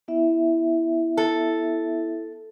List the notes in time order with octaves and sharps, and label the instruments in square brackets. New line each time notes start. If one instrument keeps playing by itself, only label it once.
[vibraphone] B3 E4 E5
[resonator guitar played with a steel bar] A4